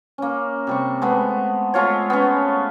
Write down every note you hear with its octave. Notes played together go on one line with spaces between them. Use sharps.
A#3 C#4
C3 G3 C#6
G#3 A3 B3
G#3 A3 F4 C#5
B3 C#4